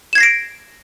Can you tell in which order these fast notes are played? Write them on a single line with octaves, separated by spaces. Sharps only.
E7 G#6 C7 A#6 D7